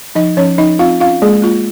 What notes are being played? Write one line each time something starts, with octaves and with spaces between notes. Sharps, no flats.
F3 D#4 D#5
F3 C#4 C#5
F3 D#4 D#5
C4 F4 F5
C#4 F4 F5
G#3 A#3 G#4
A#3 F4